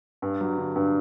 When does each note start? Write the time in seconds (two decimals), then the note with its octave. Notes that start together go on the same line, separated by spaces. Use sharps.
0.22 G2
0.41 F#3
0.58 D3
0.76 G2